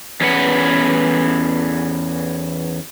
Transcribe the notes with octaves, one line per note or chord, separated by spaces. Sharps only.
E2 C#4 B4 F#5